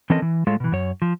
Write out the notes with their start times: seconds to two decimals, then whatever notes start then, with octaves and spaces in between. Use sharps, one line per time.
0.10 E3 C4 C#4 A4 A#4 D#5
0.22 E3
0.47 A2 G#3 F4 A4 C#5 F5
0.60 B2 E3
0.72 F#2 C#5
1.02 F3